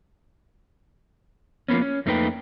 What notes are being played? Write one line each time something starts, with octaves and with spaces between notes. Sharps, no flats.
F3 A#3 B3 C#4
C#4
F2 A3 A#3 D#4 B4 G5